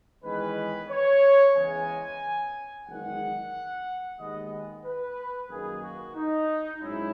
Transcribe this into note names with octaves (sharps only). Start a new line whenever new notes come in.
E2 D#3 G#3 C#4 B4
C#5
E2 C#3 E3 G#3 G#5
F#1 E2 D#3 G#3 F#5
D#2 D#3 G#3 B3 D#5
B4
F#2 D#3 A#3 G#4
F#4
D#4
G#2 F#3 C#4 E4